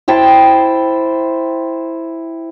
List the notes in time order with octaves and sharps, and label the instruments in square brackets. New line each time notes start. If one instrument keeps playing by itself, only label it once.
[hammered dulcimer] E4 C5 G5 A5